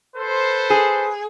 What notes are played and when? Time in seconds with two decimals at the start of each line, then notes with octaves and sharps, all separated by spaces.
0.16 A4 B4 C5
0.70 G#4